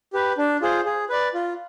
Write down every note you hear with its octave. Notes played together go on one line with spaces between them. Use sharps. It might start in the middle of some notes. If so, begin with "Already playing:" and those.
G4 B4
D4
F4 G#4 C5
G#4
B4 D5
F4